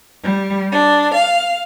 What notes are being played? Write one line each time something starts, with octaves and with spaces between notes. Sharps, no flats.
G3
D4
F5